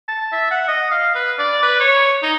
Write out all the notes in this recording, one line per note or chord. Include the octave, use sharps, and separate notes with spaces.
A5
E5
F#5
D#5
F5
B4
D5
B4
C#5
D#4